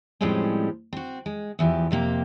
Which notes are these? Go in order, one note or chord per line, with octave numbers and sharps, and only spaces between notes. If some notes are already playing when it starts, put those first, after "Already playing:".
A2 F3 G3 G#3 C4 C#4
C4 F#4
G#3
E2 E3 F3 G4
F2 C3 A#3 G4